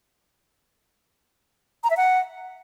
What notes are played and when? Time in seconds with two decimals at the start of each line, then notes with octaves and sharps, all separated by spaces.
1.84 A#5
1.90 E5
1.97 F#5